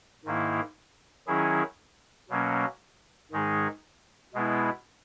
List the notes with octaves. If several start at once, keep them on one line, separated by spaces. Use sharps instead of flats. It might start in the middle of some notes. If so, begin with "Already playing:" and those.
G#2 D#3 A#3 E4
D#3 F#3 C#4 E4 G#4
B2 F#3 A#3 C#4
G#2 D#3 G#3 D#4 G#4
B2 G#3 B3 E4